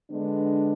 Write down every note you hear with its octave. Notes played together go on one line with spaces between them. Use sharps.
D3 G#3 B3 D4